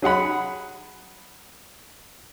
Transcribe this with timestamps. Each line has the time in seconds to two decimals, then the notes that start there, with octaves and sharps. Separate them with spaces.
0.02 F#3 G#4 F#5 B5